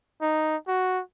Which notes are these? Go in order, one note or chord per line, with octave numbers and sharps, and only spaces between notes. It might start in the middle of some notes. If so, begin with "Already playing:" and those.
D#4
F#4